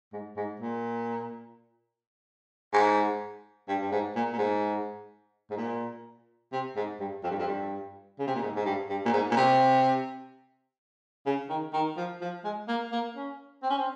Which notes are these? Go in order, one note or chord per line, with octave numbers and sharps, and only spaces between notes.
G#2
G#2
A#2
G#2
G2
G2
G#2
A#2
A#2
G#2
G#2
A#2
C3
G#2
G2
F2
G2
F2
G2
C#3
C3
A#2
G#2
G#2
G2
G2
A#2
G#2
A#2
C3
C#3
D#3
D#3
F3
F3
G#3
A#3
A#3
C#4
C4
C#4
C4